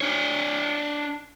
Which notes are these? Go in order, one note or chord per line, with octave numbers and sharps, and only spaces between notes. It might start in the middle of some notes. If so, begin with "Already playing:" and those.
D4 C#5